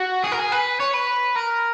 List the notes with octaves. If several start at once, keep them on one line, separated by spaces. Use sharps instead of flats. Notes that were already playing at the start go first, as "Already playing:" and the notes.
Already playing: F#4
G#4
A#4
G#4
B4
C#5
B4
A#4